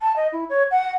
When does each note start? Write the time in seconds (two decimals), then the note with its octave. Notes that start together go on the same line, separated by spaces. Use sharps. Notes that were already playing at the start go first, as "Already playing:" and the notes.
0.01 A5
0.16 D#5
0.32 E4
0.50 C#5
0.71 F#5